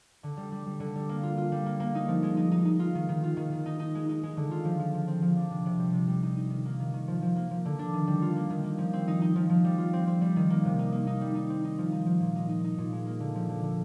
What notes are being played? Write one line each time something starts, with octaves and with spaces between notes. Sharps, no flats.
D3
G3
G3
G3
D3
G3
A#3
F4
F4
G3
A#3
A#3
D#4
F3
G#3
D#4
D#4
D#4
F4
D#3
D#3
F4
D#3
D#3
D#4
D#4
G#3
D#4
G#3
D3
F4
F3
F3
F3
C4
F3
D4
C3
C3
G3
C3
G3
D#4
D#4
D#3
A#3
D#3
D#3
F3
F3
A#3
F3
D3
D4
D#3
G3
F4
A#3
D#3
A#3
F3
C4
D#4
D#4
F3
F3
G3
F4
C4
C4
G3
D#3
A#3
C3
D#4
A#3
D#4
G3
D#4
C4
D#4
F3
D#4
F3
A#2
D#4
D#4
D#4
A#2
G#3
A#3
D3
F3
D3
D3